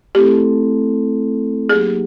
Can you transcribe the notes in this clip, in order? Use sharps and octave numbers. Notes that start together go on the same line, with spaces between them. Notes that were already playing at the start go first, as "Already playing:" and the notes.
A3 C4 E4 G4 A4
F#3 A#3 D#4 G4 G#4